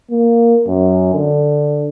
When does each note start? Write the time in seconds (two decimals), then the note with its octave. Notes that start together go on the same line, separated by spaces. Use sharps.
0.11 A#3
0.67 F#2
1.14 D3